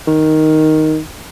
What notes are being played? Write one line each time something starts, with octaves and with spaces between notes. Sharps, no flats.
D#3